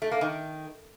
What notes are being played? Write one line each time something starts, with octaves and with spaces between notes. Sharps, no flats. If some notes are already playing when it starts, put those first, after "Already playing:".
A3
A#3
D#3